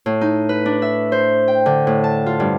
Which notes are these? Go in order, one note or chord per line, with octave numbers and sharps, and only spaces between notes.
A2
D#4
B4
D4
E5
C5
G5
D3
A2
A5
F4
G2